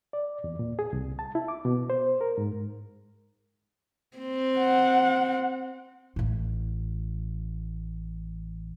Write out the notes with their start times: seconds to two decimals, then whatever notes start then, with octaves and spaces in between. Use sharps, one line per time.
0.13 D5
0.44 E2
0.59 A#2
0.79 G#4
0.93 C2
1.19 A5
1.35 E4
1.48 D6
1.65 B2
1.90 C5
2.21 A#4
2.38 G#2
4.18 C4
4.60 F#5
6.16 A1 A2